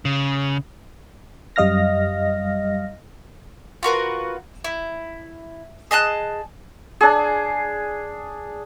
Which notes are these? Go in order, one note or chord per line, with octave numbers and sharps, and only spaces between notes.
C#3
F#2 G3 D#5 F5 F6 A#6
F4 F#4 A#4 B4
E4
G#4 D#5 A5 F#6
D4 G#4